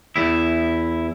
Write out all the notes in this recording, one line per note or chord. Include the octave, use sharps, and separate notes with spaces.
E2 E4